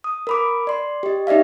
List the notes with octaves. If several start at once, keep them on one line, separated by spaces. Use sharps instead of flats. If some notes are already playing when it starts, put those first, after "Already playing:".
D#6
A#4 B5 D6
D5 C6
G4 D#5
D#4 G4 D5 E5 F5